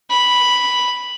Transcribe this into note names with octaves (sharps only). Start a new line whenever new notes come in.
B5